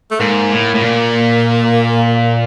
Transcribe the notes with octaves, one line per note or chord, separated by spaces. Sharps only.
A3
G#2 A#3
A2
A2
A#2